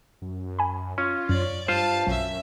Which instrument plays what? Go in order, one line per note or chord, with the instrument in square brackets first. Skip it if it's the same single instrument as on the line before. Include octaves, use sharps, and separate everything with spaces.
[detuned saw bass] F#2
[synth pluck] G#5 B5
[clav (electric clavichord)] C#4 [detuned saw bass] F4
[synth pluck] F#2 [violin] C#5 D5
[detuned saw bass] G2 [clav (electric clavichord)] F4 C5 [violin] F5 A5
[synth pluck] B1 [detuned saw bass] F#2 [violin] C#4 E5